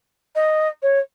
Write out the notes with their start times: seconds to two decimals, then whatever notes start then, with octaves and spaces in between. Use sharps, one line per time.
0.35 D#5
0.82 C#5